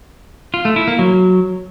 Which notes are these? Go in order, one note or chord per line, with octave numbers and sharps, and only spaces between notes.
F4
A3
E4
A#3
F#3